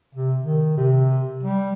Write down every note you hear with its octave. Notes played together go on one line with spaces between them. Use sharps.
C3
D#3
C3
G3